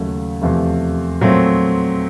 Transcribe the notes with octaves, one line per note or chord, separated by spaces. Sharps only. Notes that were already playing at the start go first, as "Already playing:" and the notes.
Already playing: D#2 C#3 F#3 A3
E2 C3 F3 A3
A#2 F#3 A3 C4